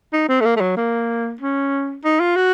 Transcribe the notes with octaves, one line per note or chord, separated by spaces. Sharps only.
D#4
C4
A3
A#3
A3
F#3
A#3
C#4
D#4
F4
F#4